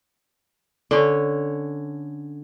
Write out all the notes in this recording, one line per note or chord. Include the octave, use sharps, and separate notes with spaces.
D3 C#4